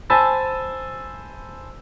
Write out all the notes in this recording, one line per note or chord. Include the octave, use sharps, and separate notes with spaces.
C5 G#5 A5 B5 E6 A6